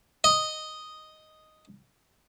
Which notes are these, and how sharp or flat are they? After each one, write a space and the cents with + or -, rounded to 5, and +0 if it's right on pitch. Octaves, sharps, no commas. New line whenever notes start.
D#5 +0